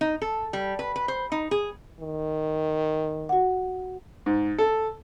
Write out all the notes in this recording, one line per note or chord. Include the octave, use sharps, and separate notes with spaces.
D#4
A4
G3
B4
B4
C5
D#4
G#4
D#3
F#4 F#5
G#2
A4